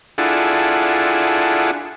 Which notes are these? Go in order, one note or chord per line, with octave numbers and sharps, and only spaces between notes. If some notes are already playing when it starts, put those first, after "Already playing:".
D4 E4 F4 G#4 A4 F#5